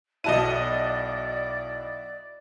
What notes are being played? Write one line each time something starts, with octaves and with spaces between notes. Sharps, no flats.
B1 E4 F#4 D5 D#5 A5 D#7